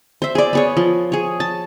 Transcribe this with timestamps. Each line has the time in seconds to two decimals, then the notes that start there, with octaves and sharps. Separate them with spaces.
0.22 C5 E5
0.35 G#4 D5
0.53 B3 G#4 C#5
0.77 F3
1.12 G#4 C#5
1.40 A5